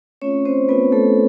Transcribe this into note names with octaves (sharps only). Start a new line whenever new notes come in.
A3 C4 C#4 F4 C#5
C4 C5
A3 B3 C4 F4 B4
A3 A4